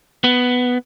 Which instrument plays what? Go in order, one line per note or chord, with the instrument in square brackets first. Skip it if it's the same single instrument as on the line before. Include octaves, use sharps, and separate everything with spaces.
[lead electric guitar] B3